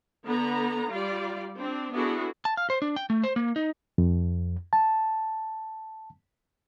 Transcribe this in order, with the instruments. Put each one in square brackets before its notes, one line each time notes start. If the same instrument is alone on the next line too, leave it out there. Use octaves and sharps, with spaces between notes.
[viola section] D3 B3 A#5
G3 F4 D5
C4 D4
B3 D4 E4 F#4 G#4 A4
[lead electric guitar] A5
F5
C5
D4
G5
A3
C5
A#3
D#4
[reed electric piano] F2
A5